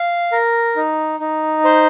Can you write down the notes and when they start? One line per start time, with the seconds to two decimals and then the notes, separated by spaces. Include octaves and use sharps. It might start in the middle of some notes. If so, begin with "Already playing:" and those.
Already playing: F5
0.32 A#4
0.76 D#4
1.20 D#4
1.65 C5